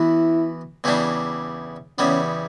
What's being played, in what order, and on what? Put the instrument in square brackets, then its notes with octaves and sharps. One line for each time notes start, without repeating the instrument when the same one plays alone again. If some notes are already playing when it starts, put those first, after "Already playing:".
Already playing: [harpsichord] E3 B3 F#4 [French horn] E4
[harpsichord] E2 C#3 E3 G3 D4
[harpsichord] E2 C#3 G3 B3 [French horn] C#4